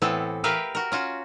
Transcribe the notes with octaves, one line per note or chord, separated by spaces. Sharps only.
A2 E3 B3 C4 A4
G4 A#4 B4 E5 F5
F#4 A#4
C#4 F4 F#4